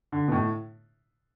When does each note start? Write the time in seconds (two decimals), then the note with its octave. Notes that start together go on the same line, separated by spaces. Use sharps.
0.12 D3
0.28 B2
0.32 A2